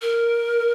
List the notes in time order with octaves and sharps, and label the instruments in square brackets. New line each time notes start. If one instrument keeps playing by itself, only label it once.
[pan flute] A#4